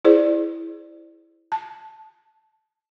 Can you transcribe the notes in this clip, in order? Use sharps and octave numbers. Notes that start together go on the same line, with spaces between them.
E4 G#4 C5 D5
A5